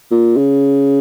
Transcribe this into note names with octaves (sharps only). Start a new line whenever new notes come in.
A#2
C#3